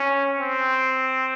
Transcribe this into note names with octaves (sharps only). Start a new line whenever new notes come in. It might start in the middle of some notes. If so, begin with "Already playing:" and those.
Already playing: C#4
C4